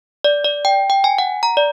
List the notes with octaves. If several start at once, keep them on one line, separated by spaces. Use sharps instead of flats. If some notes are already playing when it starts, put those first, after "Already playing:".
D5
D5
G5
G5
G#5
F#5
A#5
D5